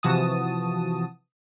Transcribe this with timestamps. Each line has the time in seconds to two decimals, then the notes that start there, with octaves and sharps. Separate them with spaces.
0.03 C3 E3 F3 F#4 A5 D#6